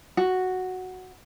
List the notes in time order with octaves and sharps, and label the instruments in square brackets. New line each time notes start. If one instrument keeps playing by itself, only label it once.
[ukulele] F#4